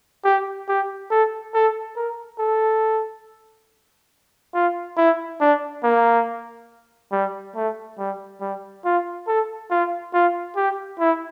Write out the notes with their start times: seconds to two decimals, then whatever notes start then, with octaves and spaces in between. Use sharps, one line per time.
0.25 G4
0.68 G4
1.11 A4
1.54 A4
1.96 A#4
2.39 A4
4.54 F4
4.97 E4
5.40 D4
5.83 A#3
7.12 G3
7.56 A3
7.98 G3
8.41 G3
8.85 F4
9.27 A4
9.71 F4
10.14 F4
10.56 G4
11.00 E4